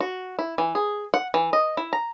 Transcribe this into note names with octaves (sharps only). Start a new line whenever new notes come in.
F#4
E4
E3
G#4
F#5
E3
D#5
E4
A#5